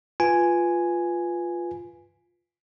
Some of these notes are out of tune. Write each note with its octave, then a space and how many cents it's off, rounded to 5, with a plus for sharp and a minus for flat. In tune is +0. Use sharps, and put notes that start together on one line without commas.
F4 +0 B4 +0 G#5 +0